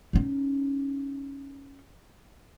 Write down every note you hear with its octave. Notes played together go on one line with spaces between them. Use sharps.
C#4 D#4